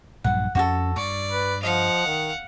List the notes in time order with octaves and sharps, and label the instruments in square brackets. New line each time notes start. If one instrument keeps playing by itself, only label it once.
[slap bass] A#1 G2 F#3 [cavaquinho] F#5
[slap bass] F2 C#4 [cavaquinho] F#4 G4 A4
[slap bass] G2 [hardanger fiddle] D5 [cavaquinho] C#6
[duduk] B4
[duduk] F3 [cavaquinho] D#5 [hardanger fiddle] F5 F#5
[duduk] D#3